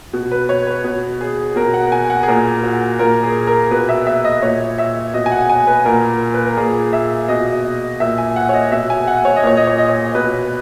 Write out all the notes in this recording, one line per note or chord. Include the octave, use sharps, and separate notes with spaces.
B2
B4
C#5
B4
B2
G#4
B2 A#4
F#5
G#5
F#5
G#4
A#2 A#4
F#4
A#2 A#4
G#4
A#4
B2 B4
E5
E5
D#5
A#2 C#5
E5
B2 D#5
G#5
F#5
G#5
B4
A#2 A#4
B4
A#4
A#2 G#4
E5
B2 D#5
A#2 E5
G#5
F#5
C#5
D#5
B2 E5
G#5
F#5
C#5
D#5
A#2 C#5
D#5
C#5
D#5
C#5
B2 B4